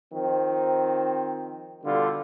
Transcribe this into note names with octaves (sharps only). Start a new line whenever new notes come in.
D#3 F3 C4
B2 D3 G3 D4 F4